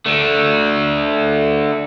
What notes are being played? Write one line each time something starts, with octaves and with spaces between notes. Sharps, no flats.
D3 A3